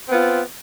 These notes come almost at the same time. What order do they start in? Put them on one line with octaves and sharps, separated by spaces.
C4 B3 F4